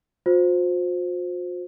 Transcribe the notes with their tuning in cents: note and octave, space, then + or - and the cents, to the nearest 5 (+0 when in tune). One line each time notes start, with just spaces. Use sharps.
F4 +45 C5 +0